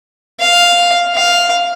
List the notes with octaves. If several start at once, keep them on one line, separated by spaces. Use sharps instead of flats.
F5
F5